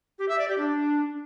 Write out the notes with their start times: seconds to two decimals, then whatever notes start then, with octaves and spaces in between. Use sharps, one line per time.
0.19 G4
0.29 E5
0.38 D5
0.48 G4
0.58 D4